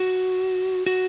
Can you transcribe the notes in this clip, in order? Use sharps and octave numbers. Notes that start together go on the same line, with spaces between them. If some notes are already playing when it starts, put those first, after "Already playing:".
Already playing: F#4
F#4